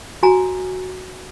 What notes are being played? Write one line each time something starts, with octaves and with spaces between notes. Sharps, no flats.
F#4 G#5 A#5